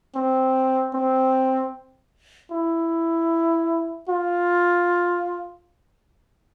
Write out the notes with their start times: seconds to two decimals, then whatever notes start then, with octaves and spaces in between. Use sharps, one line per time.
0.15 C4
0.94 C4
2.51 E4
4.09 F4